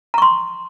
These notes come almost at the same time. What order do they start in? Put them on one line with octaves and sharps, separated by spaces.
A#5 C#6 C6